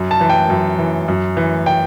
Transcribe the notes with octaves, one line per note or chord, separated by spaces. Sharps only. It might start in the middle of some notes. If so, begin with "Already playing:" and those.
Already playing: F#2
A5
E3
G5
F#2
E3
F#2
E3
G5